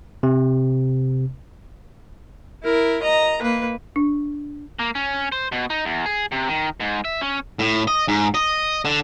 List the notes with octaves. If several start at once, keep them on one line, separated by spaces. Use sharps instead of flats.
C3
E4 A#4
D#5 A#5
A#3 B4
D4
A#3
C#4
C5
B2
D#4
E2
G#4
C3
D#3
G#2
E5
C#4
A2
D#5
G#2
D#5
D3